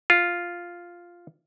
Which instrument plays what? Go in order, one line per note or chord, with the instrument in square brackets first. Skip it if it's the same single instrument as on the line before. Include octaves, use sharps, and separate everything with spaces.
[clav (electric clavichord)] F4